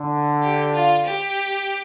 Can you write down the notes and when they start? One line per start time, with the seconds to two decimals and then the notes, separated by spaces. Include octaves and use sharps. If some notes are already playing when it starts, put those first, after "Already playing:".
Already playing: D3
0.43 G4
0.74 F4
1.06 G4